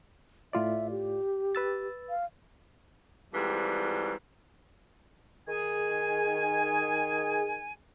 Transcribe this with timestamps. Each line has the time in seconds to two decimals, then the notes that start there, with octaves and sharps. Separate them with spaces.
0.53 A2 F4 D5 E5
0.90 G4
1.55 B4 E6 A6
2.10 F5
3.34 F2 G#2 E3 G3
5.47 D#3 G#4 G#5